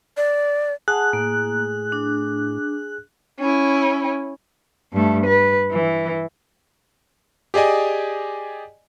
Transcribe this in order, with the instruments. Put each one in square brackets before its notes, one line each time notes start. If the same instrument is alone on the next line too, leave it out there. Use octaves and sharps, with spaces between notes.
[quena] D5
[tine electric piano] G#4 [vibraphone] F#5 A5 [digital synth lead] F#6
[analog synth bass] A2 [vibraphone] A#3
[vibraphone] D4
[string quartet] C#4 E4
[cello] G2 A3
B4
E3
[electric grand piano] G4 G#4 D5 D#5 G#5